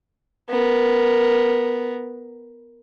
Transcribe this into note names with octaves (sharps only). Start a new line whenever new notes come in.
B3 A#4